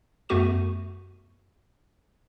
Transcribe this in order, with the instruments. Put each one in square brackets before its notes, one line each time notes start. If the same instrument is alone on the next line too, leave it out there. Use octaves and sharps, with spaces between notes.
[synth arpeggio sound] F#2 A3 B3 F#4 C#6 D#7